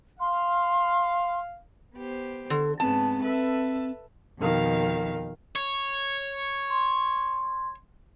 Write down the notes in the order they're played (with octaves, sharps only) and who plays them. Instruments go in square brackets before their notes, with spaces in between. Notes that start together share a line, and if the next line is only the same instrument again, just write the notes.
[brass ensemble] F5 [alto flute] C6
[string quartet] B3 G4 C5
[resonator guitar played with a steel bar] D3 [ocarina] A4
[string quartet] G#2 C#3 B3 [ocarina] C4 [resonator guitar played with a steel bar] A5
[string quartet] A4 B4 E5
F2 B2 D#3 F5
[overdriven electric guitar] C#5
[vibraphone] C6